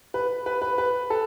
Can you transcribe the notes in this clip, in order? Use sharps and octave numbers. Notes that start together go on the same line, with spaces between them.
B4
B4
B4
B4
A4